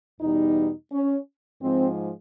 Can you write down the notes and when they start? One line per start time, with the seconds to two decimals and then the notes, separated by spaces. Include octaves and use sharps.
0.21 E2 B2 G3 D#4
0.92 C#4
1.62 G#2 F3 G#3 C4